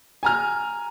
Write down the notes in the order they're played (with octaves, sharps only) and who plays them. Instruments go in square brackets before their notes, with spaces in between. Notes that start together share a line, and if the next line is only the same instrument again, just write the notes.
[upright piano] G#5 A#5 F6